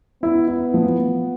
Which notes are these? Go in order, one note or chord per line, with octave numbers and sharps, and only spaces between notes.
B3 E4
E4
F3
F3